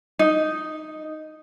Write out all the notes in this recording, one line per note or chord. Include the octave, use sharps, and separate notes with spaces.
D#4